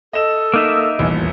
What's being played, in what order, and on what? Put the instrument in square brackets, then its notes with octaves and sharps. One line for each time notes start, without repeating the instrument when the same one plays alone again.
[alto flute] A4 [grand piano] D#5 E7
[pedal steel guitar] A#3 D#4 E5
[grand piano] D#1 A1 E2